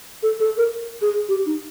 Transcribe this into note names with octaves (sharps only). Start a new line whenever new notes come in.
A4
A4
A#4
G#4
G4
D#4